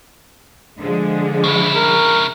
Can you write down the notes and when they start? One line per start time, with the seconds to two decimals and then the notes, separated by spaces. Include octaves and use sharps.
0.79 D3 F3 G#3
1.44 C#3 E4
1.75 A#4